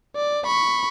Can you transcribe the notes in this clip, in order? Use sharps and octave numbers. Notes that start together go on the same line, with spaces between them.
D5
B5 C#6